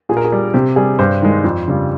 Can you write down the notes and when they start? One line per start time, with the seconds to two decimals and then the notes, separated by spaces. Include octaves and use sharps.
0.09 A#2 G#4
0.17 A#4
0.24 G#4
0.32 G3
0.54 C3 G4
0.76 G3 G#4
0.99 G2 C5
1.22 D#3 G#3
1.44 F2
1.68 C#3 G3